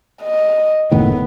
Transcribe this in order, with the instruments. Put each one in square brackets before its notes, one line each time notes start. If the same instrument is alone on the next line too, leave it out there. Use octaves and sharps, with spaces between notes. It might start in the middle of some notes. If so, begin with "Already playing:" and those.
[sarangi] D#5
[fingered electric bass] F#1 A2 D#3 [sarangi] B3